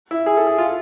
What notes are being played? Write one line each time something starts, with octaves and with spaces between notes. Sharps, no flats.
E4
G#4
A4
G#4
F4